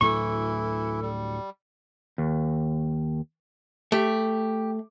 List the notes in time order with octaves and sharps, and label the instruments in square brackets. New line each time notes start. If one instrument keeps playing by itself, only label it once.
[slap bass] D2 A2 F#3 [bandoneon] E3 E4 [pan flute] A4 [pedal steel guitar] C#6
[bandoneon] G3
[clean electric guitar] D#2
[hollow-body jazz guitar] A3 [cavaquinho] G4